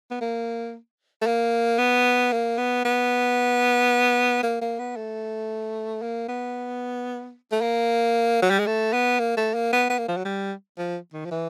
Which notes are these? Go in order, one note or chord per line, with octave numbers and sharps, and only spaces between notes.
B3
A#3
A3
A#3
B3
A#3
B3
B3
A#3
A#3
B3
A3
A#3
B3
A3
A#3
F#3
G3
G#3
A3
B3
A#3
A3
A#3
B3
B3
A#3
F3
F#3
G3
F3
D#3
F3
E3